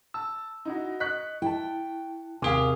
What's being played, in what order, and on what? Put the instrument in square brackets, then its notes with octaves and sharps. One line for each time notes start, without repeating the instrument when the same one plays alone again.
[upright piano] A5 [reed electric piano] E6
[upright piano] D#4 E4 F#4
[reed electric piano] D#5 [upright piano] C#6 F#6 B6
[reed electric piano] E4 A5 [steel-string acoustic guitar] G5
[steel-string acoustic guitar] D#2 F5 [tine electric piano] C3 G#4 [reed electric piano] G#5 D6